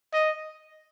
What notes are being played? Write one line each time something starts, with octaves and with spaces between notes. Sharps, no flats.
D#5